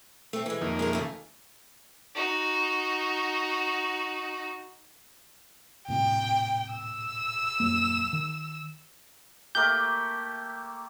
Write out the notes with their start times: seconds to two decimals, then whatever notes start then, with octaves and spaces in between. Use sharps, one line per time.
0.33 A3 C4
0.46 E3 G#3
0.61 F2 D#3 A#3
0.79 G#3 E4 A#4
0.93 C#3 A3
2.15 D#4 F#4
5.88 D#1 A2 C3 G5
6.73 E6
7.60 D#1 F#2 A#3
8.13 D#3
9.55 A3 A#3 G4 G6